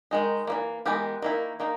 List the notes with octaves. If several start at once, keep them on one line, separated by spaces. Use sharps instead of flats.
D#3 G#3 D#4
E3 G3 A#3
E3 G#3 B3 G4 A#4
D#3 A#3 E4
D#3 A#3 D#4